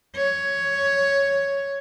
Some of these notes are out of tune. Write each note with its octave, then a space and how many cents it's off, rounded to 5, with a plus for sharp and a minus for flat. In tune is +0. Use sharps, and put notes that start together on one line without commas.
C#5 +5